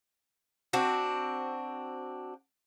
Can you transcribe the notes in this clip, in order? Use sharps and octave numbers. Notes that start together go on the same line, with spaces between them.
C4 D4 F#4